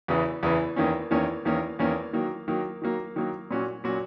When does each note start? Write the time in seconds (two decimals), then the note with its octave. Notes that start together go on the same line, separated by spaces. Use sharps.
0.08 E2 C#3 E3
0.43 E2 C#3 E3
0.76 E2 D#3 A#3 C#4
1.11 E2 D#3 A#3 C#4
1.45 E2 D#3 A#3 C#4
1.79 E2 D#3 A#3 C#4
2.13 D#3 F#3 A#3
2.48 D#3 F#3 A#3
2.82 D#3 F#3 A#3
3.16 D#3 F#3 A#3
3.51 A#2 F#3 C#4 F#4
3.84 A#2 F#3 C#4 F#4